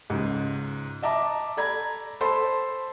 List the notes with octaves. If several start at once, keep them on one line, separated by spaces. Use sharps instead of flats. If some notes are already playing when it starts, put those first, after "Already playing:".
C#2 G#2
D#5 E5 A5 A#5 D6
A4 D5 A#5 B5 G#6
A4 C5 A5 B5 C6